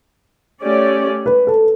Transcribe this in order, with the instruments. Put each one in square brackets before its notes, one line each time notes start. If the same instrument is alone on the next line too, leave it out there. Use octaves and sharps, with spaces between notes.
[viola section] A3 C#4 G4 D5
[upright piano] B4
A4